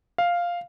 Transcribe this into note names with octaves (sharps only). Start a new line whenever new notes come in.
F5